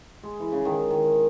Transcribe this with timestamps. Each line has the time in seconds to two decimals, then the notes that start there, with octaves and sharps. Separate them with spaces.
0.23 G#3
0.40 E3
0.52 C#3
0.65 D#3
0.91 D#3